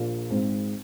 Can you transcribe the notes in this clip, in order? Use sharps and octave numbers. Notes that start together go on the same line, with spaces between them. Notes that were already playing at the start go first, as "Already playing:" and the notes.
Already playing: A#1 A#2 A#3
G#1 G#2 G#3 C4